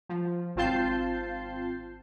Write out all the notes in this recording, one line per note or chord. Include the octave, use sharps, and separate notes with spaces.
F3
G#1 C4 F4 A5 G6 C7